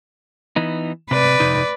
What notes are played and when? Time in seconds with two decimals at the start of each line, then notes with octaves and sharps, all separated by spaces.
0.56 E3 B3 D#4
1.11 C3 B4 D5
1.40 F2 C3 D#4